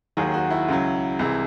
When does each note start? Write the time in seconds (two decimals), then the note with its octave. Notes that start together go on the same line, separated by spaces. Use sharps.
0.17 D#2 D#3 F#3 G#4
0.34 F#4
0.50 E4
0.68 C#2 C#3 F#3
1.19 C2 C3 E3 G#3 E4